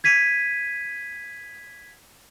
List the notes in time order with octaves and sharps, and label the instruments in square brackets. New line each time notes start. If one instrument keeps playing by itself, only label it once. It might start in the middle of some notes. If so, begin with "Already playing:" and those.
[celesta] G#6 B6 D#7